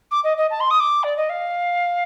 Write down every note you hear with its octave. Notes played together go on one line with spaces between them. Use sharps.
D6
D#5
D#5
A5
C6
D#6
D6
D5
D#5
F5